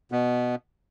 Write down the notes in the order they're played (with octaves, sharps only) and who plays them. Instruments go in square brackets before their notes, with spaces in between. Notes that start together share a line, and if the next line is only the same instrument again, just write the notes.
[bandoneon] B2 B3